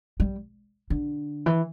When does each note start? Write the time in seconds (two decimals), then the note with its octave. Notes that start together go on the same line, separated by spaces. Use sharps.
0.20 G3
0.90 D3
1.46 E3